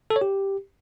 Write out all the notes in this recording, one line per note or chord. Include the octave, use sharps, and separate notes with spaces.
A4
C#5
G4